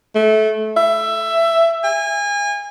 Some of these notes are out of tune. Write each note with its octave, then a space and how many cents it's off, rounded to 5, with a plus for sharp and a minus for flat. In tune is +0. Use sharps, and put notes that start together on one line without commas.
A3 -20
E5 +15
G#5 -30